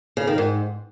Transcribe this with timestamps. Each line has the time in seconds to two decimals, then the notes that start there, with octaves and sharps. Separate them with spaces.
0.17 C#3
0.27 D#3
0.38 G#2